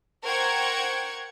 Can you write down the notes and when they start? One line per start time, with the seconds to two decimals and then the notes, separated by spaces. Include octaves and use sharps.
0.23 A#4 C5 F#5 G5 C#6 G#6